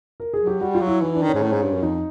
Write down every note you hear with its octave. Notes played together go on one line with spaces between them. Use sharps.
A#4
G#4
F#3
G4
G3 F#4
F4
F#3
E4
E3 D#4
D4
D#3
C#4
G#2
A2
G#2
G2
F#2
F2 D#4